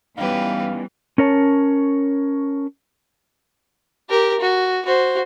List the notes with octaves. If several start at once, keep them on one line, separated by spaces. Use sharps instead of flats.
E3 G3 B3 C#4 D#4 G4 B4 F5
C#4 A#4 C#5 A5
G4 A#4
F#4
F#4 C5